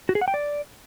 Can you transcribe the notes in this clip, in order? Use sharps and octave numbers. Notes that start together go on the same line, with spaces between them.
F#4
G#4
F#5
G5
D5